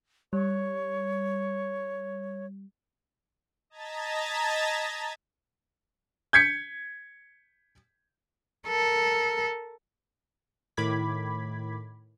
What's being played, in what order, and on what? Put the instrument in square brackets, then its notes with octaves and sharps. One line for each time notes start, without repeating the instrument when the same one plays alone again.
[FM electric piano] G3 [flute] C#5
[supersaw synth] D#5 A5 A#5 G#6 A6 B6
[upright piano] G6 G#6 B6 C#7
[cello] A4 A#4
[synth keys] A2 D#3 B5 D6 G#6 B6